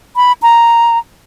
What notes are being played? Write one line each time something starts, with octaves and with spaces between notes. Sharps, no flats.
B5
A#5